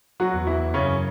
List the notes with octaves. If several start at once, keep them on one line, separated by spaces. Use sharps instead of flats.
F#3 F#4
E2
E3 E4
F#2 C#3 C#4